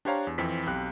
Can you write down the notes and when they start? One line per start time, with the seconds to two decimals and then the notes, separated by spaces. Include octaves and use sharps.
0.05 D4 G4 C5 C#5 F5 A#5
0.27 E2
0.38 F2 E3 C4 B6
0.66 B1 C4 G4 F#6